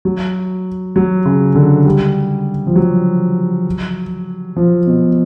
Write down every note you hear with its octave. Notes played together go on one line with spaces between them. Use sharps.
F#3
F#3
C#3
D3
G3
F3
F#3
F3
B2